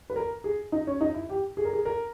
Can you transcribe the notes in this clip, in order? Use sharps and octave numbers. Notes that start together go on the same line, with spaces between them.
B4
A#4
G#4
D#4
C#4
D#4
E4
G4
G#4
A#4
G#4
A#4